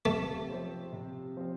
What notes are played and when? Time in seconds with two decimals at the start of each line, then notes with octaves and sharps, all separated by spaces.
0.05 C3 A3
0.50 F3 C4
0.93 C3
1.37 F3 C4